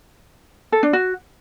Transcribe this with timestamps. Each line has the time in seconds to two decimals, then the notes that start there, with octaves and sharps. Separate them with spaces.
0.72 A4
0.83 D4
0.93 F#4